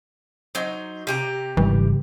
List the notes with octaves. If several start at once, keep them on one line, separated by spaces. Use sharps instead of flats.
F#3 D#4 C5
C3 G4 A#5
G#1 C#3 E3 G3